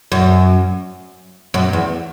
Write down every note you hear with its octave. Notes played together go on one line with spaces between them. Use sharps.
F#2
F#2
E2